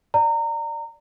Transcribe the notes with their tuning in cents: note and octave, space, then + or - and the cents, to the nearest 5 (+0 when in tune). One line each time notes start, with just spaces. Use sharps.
D5 +0 A#5 -25